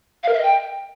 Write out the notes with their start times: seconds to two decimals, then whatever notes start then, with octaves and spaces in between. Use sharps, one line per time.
0.23 F5
0.28 A#4
0.33 E5
0.38 D#5
0.43 G5